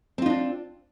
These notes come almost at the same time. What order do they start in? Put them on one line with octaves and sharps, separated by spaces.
C4 F4 D#4 D4